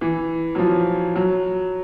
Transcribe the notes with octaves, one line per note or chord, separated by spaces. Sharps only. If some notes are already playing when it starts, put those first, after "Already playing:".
E3
F#3
F3
F#3